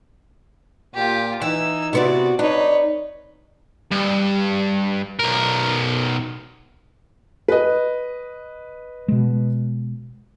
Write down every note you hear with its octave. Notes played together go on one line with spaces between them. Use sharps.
A#2 F4 G4
E3 D#4 E6
C3 B3 E4 F#4 D5
D4 D#4 B4 C#5
G2
B1 A#4
B4 D#5
B2 G#3